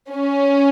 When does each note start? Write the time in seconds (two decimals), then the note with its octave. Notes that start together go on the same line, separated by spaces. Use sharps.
0.12 C#4